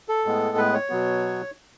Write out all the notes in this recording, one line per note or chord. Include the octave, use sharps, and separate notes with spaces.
A4
A2 G#3 B3
B4
C#5
B2 F#3 B3